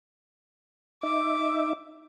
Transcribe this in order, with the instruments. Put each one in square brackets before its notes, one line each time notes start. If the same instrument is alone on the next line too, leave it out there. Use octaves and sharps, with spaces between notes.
[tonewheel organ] D#4 E5 [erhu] D6